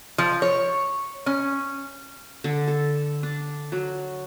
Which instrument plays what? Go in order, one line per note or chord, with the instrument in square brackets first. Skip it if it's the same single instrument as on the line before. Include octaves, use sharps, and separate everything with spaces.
[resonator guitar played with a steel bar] F3
C#5
C#4
[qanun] D3
A4
D4
F#3